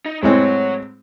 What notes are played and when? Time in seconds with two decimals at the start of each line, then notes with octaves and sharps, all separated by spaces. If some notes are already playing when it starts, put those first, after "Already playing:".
0.06 D#4
0.23 A2 F#3 G#3 C4 C#5